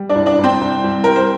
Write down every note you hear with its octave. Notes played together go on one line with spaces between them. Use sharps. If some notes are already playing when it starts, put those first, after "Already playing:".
Already playing: G3
D4 D5
C2
D4 D5
C2
C4 C5
C2
C2
G3 A#4
C5